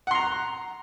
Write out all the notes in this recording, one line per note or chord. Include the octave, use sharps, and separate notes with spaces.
F#5 A#5 C6